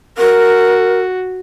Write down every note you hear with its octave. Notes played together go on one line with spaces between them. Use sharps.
F#4 A#4